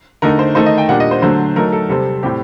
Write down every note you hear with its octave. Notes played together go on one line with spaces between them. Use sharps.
D3 A3 D#4 A#4
C5
D#3 A3 D#4 C5
D#5
G5
A#2 G3 D4 F#5
D#5
C5
D3 F#3 A3 C5
F#3 A3 D#4 A#4
A4
C3 G3 C4 A4
A2 G3 C4 G4